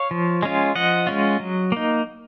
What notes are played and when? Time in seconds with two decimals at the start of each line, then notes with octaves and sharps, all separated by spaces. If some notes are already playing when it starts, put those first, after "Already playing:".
Already playing: C#5 F5
0.11 F3
0.43 G#3 C#4 F4
0.75 F3 D#5 F#5
1.07 G#3 C#4 F4
1.40 F#3
1.72 A#3 D#4